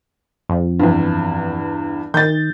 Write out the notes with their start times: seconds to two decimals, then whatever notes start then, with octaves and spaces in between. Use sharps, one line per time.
0.49 F2
0.79 E2 G2
2.14 D#3 G6 A6